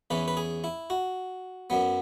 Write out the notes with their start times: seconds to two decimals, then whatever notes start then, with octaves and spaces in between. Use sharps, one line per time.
0.10 E2 E3 C#4 B4
0.28 B4
0.37 G#4
0.64 E4
0.90 F#4
1.70 F#2 F#3 B3